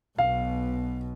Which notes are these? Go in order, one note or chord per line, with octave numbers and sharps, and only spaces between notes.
B1 B2 F5